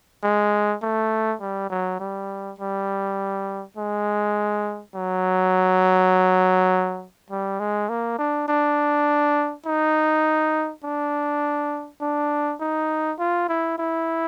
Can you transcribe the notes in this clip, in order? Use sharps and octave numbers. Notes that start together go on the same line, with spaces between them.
G#3
A3
G3
F#3
G3
G3
G#3
F#3
G3
G#3
A#3
D4
D4
D#4
D4
D4
D#4
F4
E4
E4